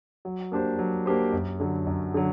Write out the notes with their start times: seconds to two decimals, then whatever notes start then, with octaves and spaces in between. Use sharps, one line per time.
0.25 F#3
0.52 A#3 D4 G4 C5
0.79 F#3
1.06 A#3 D4 G4 C5
1.33 F#2
1.60 D3 F#3
1.87 F#2
2.14 D3 F#3